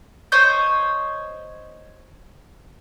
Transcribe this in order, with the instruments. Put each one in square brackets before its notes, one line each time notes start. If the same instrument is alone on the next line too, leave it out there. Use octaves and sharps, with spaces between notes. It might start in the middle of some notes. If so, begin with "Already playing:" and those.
[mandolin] C5 C#5 D#5 G6